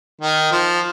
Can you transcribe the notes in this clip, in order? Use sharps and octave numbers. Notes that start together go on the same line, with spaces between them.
D#3
F3